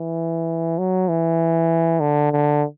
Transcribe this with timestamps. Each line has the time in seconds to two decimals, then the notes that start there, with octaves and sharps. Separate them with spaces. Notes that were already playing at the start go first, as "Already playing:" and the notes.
Already playing: E3
0.78 F#3
1.08 E3
2.00 D3
2.32 D3